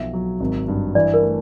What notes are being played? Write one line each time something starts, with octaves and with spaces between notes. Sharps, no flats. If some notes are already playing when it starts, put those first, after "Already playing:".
Already playing: B1 F3 E5
F#3
G#1
G2
E3 D5
A#4
A3